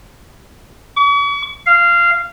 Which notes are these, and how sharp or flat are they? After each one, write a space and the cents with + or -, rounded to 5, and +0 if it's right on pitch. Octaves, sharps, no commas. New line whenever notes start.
C#6 +45
F5 -15